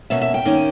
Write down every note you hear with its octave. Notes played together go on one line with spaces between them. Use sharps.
B2 A#3 C#4 E5
E5
G5
D#3 A#3 C#4